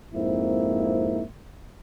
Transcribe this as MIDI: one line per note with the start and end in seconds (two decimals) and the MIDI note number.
0.14 1.22 41
0.14 1.22 44
0.14 1.22 58
0.14 1.22 60
0.14 1.22 64